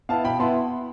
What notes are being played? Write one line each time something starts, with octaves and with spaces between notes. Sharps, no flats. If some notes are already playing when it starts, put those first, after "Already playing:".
B3 E4 F5 A5
B2 G5 B5
B3 E4 A5 C6